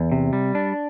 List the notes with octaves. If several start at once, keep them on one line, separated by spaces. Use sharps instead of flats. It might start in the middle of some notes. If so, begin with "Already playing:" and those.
Already playing: E2
C3
G3
D4